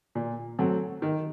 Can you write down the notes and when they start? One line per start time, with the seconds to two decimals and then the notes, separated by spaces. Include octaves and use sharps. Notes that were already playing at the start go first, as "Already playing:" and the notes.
0.15 A#2
0.59 F#3 A3 C4
1.02 D#3